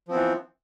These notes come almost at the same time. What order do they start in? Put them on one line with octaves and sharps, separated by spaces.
F3 C4 B3 E3